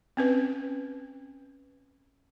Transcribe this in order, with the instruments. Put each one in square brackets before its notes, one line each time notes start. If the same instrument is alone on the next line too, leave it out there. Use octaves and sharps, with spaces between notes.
[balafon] C4 C#4 B4